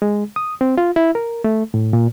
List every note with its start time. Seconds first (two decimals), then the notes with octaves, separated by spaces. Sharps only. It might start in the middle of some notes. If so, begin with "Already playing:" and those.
0.02 G#3
0.36 D#6
0.61 C4
0.78 F4
0.96 E4
1.15 A#4
1.44 A3
1.74 A2
1.93 A#2